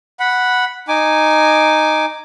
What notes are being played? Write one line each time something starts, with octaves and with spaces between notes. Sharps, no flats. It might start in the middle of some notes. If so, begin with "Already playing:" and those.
F#5 B5
D#4 G#5 D6